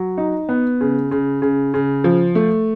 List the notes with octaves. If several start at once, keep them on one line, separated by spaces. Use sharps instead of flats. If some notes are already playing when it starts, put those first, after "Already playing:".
Already playing: F#3
D#4
B3
C#3
C#3
C#3
C#3
F3
A3